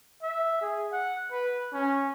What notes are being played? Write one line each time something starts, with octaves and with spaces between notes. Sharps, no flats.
E5
G#4
F#5
B4
C#4